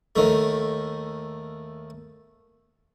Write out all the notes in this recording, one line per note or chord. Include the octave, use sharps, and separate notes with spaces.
D#2 D#3 A3